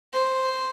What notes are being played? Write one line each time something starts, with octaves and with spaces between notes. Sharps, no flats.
C5